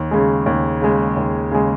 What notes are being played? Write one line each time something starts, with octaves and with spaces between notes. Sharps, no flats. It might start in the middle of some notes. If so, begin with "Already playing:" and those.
Already playing: D#2
C#3 G#3
D#2
C#3 G#3
D#2
C#3 G#3